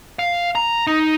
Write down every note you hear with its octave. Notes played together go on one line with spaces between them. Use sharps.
F5
A#5
D#4